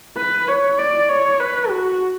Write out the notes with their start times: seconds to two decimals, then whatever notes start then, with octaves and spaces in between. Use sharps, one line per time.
0.17 B4
0.48 C#5
0.78 D5
1.09 C#5
1.40 B4
1.70 F#4